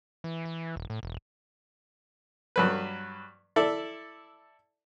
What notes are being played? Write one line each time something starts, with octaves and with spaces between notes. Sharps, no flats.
E3
E3
D#1
A2
E1
G2 F#3 B4
E4 A4 D5